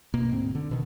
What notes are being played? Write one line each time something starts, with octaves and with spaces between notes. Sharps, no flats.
B2 A#3
D2 G#2 C4
D3
B2 D#3